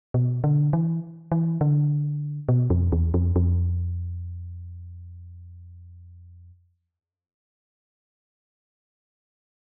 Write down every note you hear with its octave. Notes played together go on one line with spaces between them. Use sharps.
B2
D3
E3
E3
D3
B2
F2
E2
F2
F2